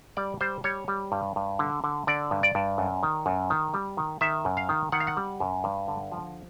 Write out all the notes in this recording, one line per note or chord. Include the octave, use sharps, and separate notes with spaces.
G3 D5
G3 C5
G3 C#5
G3
G2
G2
D3
D3
D3 D5
G2
D5
G2
F#2
D#3
F#2
D#3
G3
D#3
D#3 E5
F#2
F5
D#3
D#3 F#5
F5
F#5
G3
F#2
G2
D3
F3